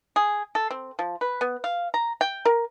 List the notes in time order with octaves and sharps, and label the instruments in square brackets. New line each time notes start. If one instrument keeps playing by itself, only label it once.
[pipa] G#4
A4
C4
F3
B4
B3
F5
A#5
G5
A#4